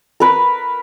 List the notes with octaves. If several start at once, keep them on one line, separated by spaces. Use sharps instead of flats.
A#4 B4